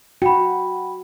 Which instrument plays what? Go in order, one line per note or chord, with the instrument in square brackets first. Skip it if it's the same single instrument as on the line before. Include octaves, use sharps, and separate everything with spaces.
[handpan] F#4 [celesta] G5 B5